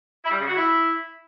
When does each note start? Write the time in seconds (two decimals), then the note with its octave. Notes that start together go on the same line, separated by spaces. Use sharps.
0.22 E4
0.30 G3
0.39 C#3
0.47 F#4
0.55 E4